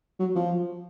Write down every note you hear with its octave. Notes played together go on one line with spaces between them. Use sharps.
F#3
F3